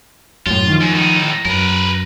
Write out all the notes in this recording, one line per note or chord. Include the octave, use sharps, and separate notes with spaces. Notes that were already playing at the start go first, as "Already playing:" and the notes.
F#2 A2 F4
D#3 F3
F#2
A2 D#4
F#2 A#4 B4